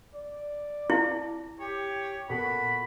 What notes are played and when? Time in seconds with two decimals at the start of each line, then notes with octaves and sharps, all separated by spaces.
0.15 D5
0.90 E4 A5 A#5 A6
1.60 G4 C#5
2.29 A#2 B3 F#4 A4 B5